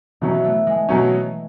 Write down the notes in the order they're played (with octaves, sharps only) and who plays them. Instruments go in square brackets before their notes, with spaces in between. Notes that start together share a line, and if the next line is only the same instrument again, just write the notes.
[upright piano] B2 F#3 C#4 [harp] E3
[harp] B3
A3
G#3
[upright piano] B2 F#3 C#4 [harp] G#3